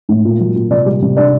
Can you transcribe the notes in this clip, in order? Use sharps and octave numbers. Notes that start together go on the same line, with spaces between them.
A2
A#2
F#3
A#2
C3 D5
G3
C3
D4 D5